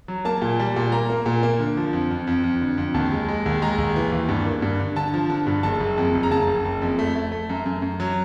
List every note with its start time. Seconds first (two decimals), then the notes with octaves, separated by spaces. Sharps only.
0.08 F#3
0.25 A#3 A5
0.42 A#2
0.59 G3
0.76 A#2
0.92 A#3 A#5
1.10 A#3
1.26 A#2
1.43 A#3
1.59 D3
1.77 F3
1.93 F2
2.11 F2
2.27 F2
2.44 F2
2.61 D3
2.78 F2
2.94 D#2 A5
3.12 G#3
3.28 G#3
3.46 D#2
3.62 G#3 A#5
3.78 D#2
3.96 E3
4.12 D#2
4.29 G2
4.45 A#3
4.62 G2
4.79 D3
4.96 D3 A5
5.14 F3
5.30 D3
5.47 G2
5.63 F#1 A5
5.80 F#1
5.98 F2
6.15 F#1
6.23 A#5
6.31 C#3 A5
6.47 F#1
6.65 F#1
6.82 F2
6.99 A3
7.16 A3
7.32 A3
7.49 F#2
7.66 F#2
7.82 F#2
8.00 F#3